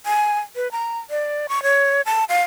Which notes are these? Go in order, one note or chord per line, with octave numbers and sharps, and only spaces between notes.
G#5
B4
A#5
D5
C#6
C#5
A5
F5